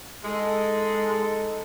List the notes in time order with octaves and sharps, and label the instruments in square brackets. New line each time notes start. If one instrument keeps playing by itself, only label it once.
[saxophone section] G#3 [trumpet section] D#4 A4